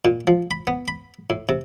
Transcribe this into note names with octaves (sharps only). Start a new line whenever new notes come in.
A#2
F3
B5
B3
B5
A2
C3